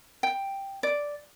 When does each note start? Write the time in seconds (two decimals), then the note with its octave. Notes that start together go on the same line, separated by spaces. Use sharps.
0.23 G5
0.83 D5